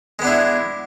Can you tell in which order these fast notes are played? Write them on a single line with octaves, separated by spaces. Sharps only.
G#3 B3 D4 E4